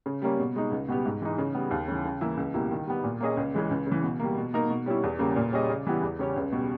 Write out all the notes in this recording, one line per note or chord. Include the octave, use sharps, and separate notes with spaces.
C#3
G3 A#3 C#4
B2
G#3 D#4
C#2
B2 G3 B3 G4
G#2
E3 G#3 D#4
C#3
G3 B3
D#2
C#3 E3
C#3
E3 A#3 E4
C#2
B2 G3 A#3 E4
D#3
G3 B3
A#2
A#3 C#4 G#4 D#5
C#2
C#3 E3 G#3
C#2
C#3 E3
B2
G3 A#3
B2
A#3 D#4 A#4
B2
G3 C#4 E4
E2
C#3 G3 A#3
A#2
G3 C#4 G#4 D#5
C#3
E3 G3 B3 E4
E2
C#3 G3 C#4 G4
C#2
B2 G3